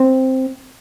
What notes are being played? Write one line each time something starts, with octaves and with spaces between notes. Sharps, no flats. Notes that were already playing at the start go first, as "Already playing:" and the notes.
Already playing: C4